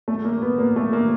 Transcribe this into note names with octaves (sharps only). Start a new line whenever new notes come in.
A3
A#3
B3
A#3
A3
A#3